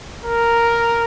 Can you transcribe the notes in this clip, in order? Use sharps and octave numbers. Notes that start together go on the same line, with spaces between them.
A#4